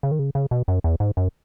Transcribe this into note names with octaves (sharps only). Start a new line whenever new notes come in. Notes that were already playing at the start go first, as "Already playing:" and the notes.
C#3
D#3
C#3
C#3
B2
F#2
E2
G#2
F#2